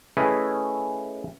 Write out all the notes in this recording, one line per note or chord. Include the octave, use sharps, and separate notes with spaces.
A3 C#4 E4 G#4 B4 D#5